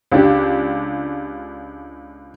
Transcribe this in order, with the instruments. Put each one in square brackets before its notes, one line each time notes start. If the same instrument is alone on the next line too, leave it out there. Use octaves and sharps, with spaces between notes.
[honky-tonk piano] C#2 D4 G4